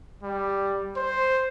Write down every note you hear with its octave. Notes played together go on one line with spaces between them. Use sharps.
G3
C5